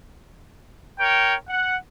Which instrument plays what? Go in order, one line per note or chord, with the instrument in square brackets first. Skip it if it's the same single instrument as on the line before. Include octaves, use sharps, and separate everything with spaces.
[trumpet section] A#4 C#5 G5
F#5